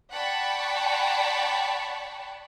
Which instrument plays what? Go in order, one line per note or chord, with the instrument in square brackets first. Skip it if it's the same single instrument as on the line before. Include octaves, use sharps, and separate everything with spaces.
[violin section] D5 F#5 G5 A5 B5 C#6